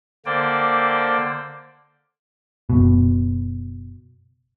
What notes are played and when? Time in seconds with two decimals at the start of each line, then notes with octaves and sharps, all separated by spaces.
0.26 D3 A#3 C5 D5 G5
2.70 F#1 B2